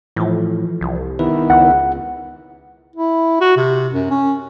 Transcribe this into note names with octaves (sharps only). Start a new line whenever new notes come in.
A2 E3 F3
C2
D#3 B3 E4 B4
C#2 F#5
E4
F#4
C3
F#2
C#4